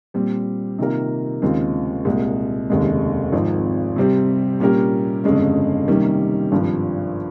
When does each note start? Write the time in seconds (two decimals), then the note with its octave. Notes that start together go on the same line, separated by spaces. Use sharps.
0.14 A#2 G3 C4
0.79 C3 D#3 A#3 F4 A#4
1.42 D#2 C#3 G#3 C4 F4
2.05 C2 A#2 G#3
2.70 F1 D#2 C#3 G#3
3.32 G#1 G#2 F3 C4
3.96 C3 G3 C4 G4
4.60 A#2 G3 C#4 G4 A#4
5.24 G1 F2 C#3 G#3 C#4
5.87 C3 D#3 G3 A#3 C#4
6.52 G#1 G2 F3